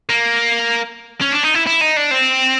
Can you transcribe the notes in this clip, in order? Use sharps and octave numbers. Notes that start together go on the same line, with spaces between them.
A#3
C#4
D4
D#4
E4
E4
D#4
D4
C4